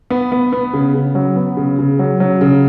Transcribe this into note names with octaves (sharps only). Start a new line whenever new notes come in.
B3
B3
B3
C#3
C#3
F#3
B3
C#3
C#3
F#3
F#3
C#3